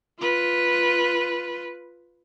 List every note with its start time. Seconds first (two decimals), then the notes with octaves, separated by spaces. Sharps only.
0.19 F4 B4